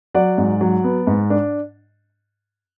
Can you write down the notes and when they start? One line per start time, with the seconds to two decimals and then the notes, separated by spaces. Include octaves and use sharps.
0.14 F#3 D5 F#5
0.38 G#2
0.61 F#3
0.84 B3
1.07 G#2
1.30 D4